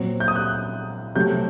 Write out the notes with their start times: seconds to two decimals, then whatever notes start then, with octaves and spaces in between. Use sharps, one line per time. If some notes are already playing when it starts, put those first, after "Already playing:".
Already playing: A#2 F#3 C4
0.20 G6
0.28 D#6
0.36 F#6
1.16 C3 F#3 A3 G6